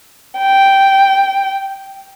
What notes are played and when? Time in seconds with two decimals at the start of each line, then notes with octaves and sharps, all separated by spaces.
0.39 G5